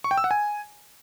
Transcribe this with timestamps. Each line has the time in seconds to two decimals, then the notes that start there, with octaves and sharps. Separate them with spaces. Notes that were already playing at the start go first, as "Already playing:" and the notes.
0.04 C#6
0.11 G5
0.17 E6
0.24 F#5
0.31 G#5